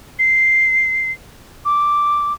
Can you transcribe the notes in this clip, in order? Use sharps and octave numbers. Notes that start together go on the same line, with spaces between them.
C7
D6